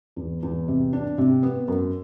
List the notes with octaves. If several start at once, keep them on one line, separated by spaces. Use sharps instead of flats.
E2
E2
C3
D4
C3
B3
F#2